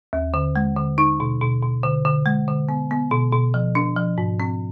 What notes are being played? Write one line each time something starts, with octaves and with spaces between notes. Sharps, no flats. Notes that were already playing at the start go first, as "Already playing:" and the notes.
D#2
D3
G#3
D3
D#4
B2
B2
B2
D3
D3
G#3
D3
B3
B3
B2
B2
F3
D4
F3
G#2
C4